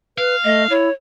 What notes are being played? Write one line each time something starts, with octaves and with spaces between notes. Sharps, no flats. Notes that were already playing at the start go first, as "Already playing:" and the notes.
B4 F5
A3 D#5
E4 C#5